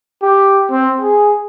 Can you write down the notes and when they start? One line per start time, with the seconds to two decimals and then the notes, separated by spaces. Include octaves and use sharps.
0.22 G4
0.70 C4
1.00 G#4